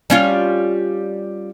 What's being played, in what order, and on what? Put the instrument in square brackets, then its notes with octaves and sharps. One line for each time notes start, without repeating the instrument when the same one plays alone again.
[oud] G3 C#4 F4